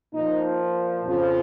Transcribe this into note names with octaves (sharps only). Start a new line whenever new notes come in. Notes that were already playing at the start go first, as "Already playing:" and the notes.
A#2 F3 D#4
F2 C#3 F3